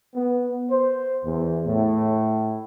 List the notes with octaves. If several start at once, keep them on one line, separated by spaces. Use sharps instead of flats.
B3
C5
E2
A2